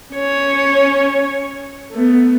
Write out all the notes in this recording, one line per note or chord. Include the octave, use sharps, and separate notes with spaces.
C#4 C#5
A3 B3